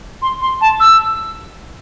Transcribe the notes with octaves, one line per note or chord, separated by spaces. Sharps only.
C6
C6
A5
E6